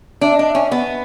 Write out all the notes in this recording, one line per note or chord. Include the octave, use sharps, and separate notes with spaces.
D4 E5
D4 D#5
C#4 E5
B3